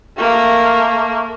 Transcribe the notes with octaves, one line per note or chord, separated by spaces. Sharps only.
A3 A#3